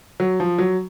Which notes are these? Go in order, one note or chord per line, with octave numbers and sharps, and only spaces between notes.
F#3
F3
F#3